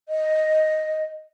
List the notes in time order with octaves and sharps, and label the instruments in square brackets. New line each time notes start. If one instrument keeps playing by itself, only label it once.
[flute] D#5